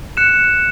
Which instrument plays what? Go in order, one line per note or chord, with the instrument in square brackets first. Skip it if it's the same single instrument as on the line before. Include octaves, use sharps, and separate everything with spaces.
[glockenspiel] F#6 C#7 E7